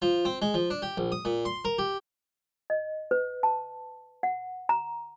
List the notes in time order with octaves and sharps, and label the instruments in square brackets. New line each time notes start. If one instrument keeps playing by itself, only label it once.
[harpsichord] F3
C4
G#3
F3
D4
G4
A#1
D#6
A#2
C6
A#4
G4
[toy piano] D#5
B4
A5
F#5
A#5